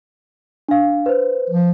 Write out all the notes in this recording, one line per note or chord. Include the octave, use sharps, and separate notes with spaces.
D4 F5
B4 C5
F3